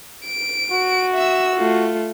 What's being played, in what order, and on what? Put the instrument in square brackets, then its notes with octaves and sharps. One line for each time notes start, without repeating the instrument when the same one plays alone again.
[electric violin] D7
[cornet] F#4
[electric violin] E5 E6
A3 F4